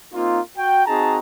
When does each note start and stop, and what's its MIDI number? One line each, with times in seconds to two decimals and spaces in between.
0.13 0.40 58
0.13 0.40 60
0.13 0.40 63
0.13 0.40 65
0.57 0.83 66
0.57 0.83 79
0.86 1.19 60
0.86 1.19 63
0.86 1.19 66
0.86 1.19 68
0.86 1.19 81
0.86 1.19 82